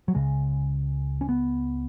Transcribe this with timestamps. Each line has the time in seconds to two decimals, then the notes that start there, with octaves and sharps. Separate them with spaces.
0.08 F#3
0.15 C#2 C#3 G#3
1.21 C#4
1.29 B3